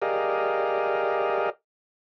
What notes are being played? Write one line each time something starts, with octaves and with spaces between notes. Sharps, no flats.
G4 G#4 A#4 D5 D#5 F5